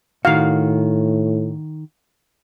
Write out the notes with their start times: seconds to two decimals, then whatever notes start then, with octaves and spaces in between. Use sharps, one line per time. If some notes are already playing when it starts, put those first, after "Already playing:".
0.25 A2 D#3 F#4 F5